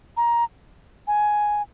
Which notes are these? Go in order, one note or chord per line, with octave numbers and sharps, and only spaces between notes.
A#5
G#5